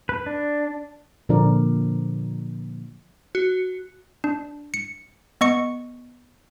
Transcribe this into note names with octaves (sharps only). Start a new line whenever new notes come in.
B4
D4
A#2 D3 F3 D4 A#4 D5
F#4
D4
C#7
B3 D#5 C#6 C#7